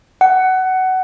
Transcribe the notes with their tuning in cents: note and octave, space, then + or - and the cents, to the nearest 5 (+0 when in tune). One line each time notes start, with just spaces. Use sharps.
F#5 +20